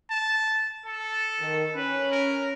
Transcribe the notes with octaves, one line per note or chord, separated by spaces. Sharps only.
A5
A4
D#3
C#4 B4
A#4